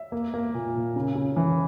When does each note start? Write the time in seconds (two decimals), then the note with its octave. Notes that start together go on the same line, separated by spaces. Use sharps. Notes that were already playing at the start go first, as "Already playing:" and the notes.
Already playing: E5
0.12 A#3
0.34 A#3
0.55 A#2
0.75 A#2
0.96 C#3
1.16 C#3
1.36 E3